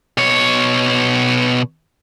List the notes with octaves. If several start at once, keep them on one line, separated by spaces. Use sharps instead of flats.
B2 C#5